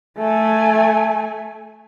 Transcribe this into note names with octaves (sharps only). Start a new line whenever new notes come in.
A3 G#5